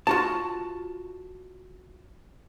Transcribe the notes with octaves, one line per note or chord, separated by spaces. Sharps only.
F4 F#4 A5